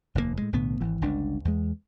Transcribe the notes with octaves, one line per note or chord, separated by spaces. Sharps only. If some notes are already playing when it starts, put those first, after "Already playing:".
F1 D#2 B2 A#3
A2 G#3
B1 A2 D3 B3
G#1 E3
G1 C#2 D4
E2 G#3